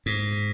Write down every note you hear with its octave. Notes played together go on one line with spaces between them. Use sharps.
G#2